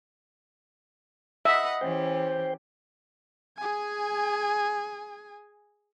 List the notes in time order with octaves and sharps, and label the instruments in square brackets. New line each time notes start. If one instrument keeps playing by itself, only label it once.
[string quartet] D#5 F#5 B5 [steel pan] E5
[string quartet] E3 C#4 G4 [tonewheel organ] C5 G5
[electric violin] G#4 G#5